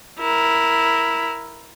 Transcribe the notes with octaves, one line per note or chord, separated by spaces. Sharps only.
E4 A#4